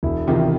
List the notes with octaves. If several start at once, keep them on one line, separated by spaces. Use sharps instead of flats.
E1 E4
E2 C3 D#3 F4